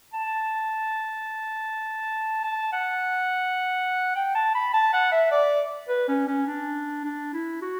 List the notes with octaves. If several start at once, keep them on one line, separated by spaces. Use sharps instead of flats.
A5
A5
F#5
G5
A5
B5
A5
F#5
E5
D5
B4
C#4
C#4
D4
D4
E4
F#4